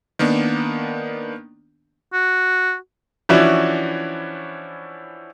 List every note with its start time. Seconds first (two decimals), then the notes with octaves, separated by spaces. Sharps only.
0.19 D#3 A#3 B3 D4
2.13 F#4
3.29 E3 F3 C#4 D4 E4 F#4